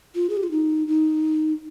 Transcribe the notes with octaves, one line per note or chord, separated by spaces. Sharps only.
F4
G#4
G4
F4
D#4
D#4